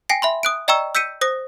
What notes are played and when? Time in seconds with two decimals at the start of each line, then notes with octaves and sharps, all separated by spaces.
0.09 G5 G#5 A#6 C7
0.22 E5 B5 C6
0.43 D#6 F#6 D7
0.68 D5 D#5 G5 A#5 C#6 E6
0.95 E6 G6 B6 C#7 D#7
1.21 C5 D#6 A#6